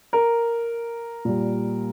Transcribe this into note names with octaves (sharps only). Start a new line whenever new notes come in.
A#4
A#2 G3